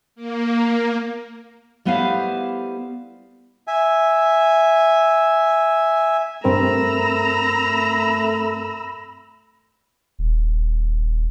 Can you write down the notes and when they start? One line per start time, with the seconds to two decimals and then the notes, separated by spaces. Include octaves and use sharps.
0.16 A#3
1.85 G3 A3 B3 E4 C5 F5
3.67 E5 G#5
6.44 G2 A3 C4 A#4 A#5 B5 E6
7.36 A3
10.19 D#1